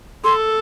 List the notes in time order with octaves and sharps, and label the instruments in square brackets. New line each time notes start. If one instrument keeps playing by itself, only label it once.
[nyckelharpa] A4 [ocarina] C6